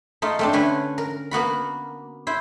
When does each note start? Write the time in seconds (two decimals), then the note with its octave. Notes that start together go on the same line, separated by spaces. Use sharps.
0.22 A3 D#4 F4
0.39 A3 C4 D4
0.53 D3 A3 C#4 B4
0.98 A#4
1.31 A#3 B3 F#4 B5
2.27 E4 C5